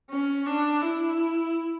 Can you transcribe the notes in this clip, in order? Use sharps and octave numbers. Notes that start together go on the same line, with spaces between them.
C#4
D4
E4